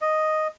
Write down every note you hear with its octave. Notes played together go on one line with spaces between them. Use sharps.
D#5